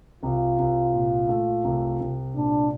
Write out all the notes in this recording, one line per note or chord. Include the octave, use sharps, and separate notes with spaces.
C2 F4
C2
A#2
A3
C2
C2
A#2 D4